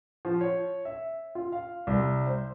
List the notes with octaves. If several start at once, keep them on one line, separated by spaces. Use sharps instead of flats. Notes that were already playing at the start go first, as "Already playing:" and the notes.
F3
C#5
E5
F4
F5
C2
C5